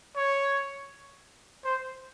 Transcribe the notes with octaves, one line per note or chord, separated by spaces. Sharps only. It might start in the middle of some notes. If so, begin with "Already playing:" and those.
C#5
C5